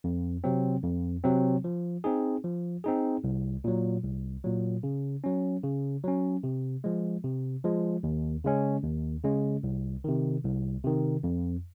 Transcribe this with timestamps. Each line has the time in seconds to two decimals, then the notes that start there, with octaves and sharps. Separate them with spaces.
0.04 F2
0.44 C3 F#3 C4
0.84 F2
1.24 C3 F#3 C4
1.64 F3
2.04 C4 D#4 G#4
2.44 F3
2.84 C4 D#4 G#4
3.24 C2
3.64 A#2 F#3
4.04 C2
4.44 A#2 F#3
4.83 C#3
5.24 F#3 C#4
5.64 C#3
6.04 F#3 C#4
6.43 C3
6.84 F3 G#3
7.24 C3
7.64 F3 G#3
8.03 D#2
8.44 C#3 G#3 C#4
8.83 D#2
9.24 C#3 G#3 C#4
9.63 C2
10.04 C3 D#3
10.44 C2
10.84 C3 D#3
11.23 F2